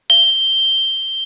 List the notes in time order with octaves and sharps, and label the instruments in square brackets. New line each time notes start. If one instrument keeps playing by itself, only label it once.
[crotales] G7